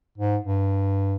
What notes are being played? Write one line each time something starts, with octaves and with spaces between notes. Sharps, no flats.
G#2
G2